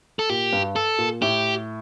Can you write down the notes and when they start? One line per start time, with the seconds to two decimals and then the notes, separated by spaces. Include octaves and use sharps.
0.19 A4
0.29 A#2 G4
0.53 G2
0.76 A4
0.98 A#2
1.22 A2 G4